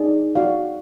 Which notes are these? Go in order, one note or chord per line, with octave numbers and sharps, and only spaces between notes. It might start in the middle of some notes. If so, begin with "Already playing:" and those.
Already playing: D#4 G#4 D5
F#4 D5 F5